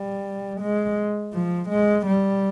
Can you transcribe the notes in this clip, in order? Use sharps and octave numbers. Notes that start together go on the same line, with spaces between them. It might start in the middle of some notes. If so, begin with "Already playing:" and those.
Already playing: G3
G#3
F3
G#3
G3